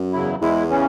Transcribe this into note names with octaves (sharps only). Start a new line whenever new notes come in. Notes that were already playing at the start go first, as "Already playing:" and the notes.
Already playing: F#2
E2 C#3 F#3 E4
E2 G#2 G#3 E4
C#3 E3 C#4